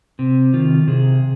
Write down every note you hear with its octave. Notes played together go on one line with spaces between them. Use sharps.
C3
D#3 F4
C3 G#4